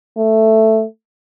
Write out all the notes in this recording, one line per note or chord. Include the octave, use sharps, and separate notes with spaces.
A3